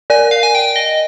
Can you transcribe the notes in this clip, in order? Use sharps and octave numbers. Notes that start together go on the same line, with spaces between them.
A#4 D5 G#5
F5
G#5
G5
D#5